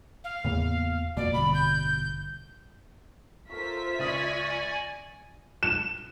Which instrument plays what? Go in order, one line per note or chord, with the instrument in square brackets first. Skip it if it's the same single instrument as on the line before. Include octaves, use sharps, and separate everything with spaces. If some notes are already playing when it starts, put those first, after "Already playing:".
[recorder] F5
[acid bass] E2 [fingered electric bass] A2 C#3 A#3
[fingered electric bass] F2 A#3 [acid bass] B2 [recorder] D5
[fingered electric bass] A1 G2 D3 [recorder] B5
[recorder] G6
[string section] F4 E5 B6 [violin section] A4 A#4 C5 [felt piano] C#6
[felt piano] C#2 D#6 [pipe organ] D5 G#5 [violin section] C#6 G#6 A#6
[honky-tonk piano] E7